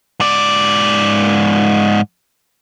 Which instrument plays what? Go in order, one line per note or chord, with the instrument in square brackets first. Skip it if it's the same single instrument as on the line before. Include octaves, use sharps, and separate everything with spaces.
[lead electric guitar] G#2 D5